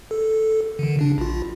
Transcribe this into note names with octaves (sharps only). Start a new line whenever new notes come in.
A4
D3 D#3
C#3 D4
A#1 F4